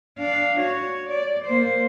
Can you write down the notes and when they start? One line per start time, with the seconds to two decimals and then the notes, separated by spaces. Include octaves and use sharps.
0.19 D4 F5
0.59 F#4 C#5
1.10 D5
1.45 A#3 C5